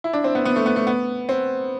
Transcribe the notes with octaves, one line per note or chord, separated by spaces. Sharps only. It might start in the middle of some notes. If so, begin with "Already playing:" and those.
E4
D4
C4
B3
B3
A3
B3
A3
B3
C4